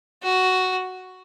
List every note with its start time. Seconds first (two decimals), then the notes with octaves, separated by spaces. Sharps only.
0.22 F#4